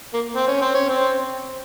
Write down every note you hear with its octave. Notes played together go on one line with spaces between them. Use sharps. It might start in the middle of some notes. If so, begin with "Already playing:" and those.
A#3
C4
C#4
C4
C#4
C4